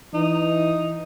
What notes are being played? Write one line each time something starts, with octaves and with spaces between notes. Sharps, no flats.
E3 D#4